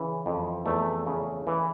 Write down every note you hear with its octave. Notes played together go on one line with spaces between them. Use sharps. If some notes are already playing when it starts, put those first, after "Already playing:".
Already playing: C#3 E3
F2
E2 A3
C#3
E3